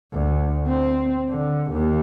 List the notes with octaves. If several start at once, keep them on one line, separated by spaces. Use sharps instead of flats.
D2
C4
D3
D#2